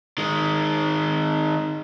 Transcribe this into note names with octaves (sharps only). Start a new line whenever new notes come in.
D#3 G#3